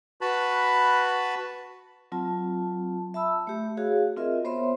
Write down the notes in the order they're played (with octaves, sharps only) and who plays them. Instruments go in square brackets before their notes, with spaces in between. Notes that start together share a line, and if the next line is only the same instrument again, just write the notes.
[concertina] F#4 B4 A5 B5
[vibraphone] F#3 C4 F4 A5
E5 A5 B5 E6
A3 G4
F#4 G#4 C#5 F5
C4 F4 A#4 D#5 E5
B3 C5 C#5 E5 C6